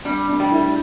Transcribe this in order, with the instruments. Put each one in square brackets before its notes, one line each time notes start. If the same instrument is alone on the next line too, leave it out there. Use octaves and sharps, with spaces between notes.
[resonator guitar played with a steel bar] G3 [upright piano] D4
[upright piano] D4
[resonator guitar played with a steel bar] G3
[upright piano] E4